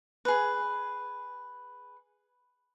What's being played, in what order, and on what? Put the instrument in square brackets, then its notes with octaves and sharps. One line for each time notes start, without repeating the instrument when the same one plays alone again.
[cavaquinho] G#4 B4